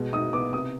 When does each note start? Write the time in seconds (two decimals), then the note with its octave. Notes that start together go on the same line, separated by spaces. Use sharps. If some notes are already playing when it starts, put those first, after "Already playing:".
Already playing: B2 G#3
0.13 D#4 D#6
0.33 B3 D6
0.53 C3 D#6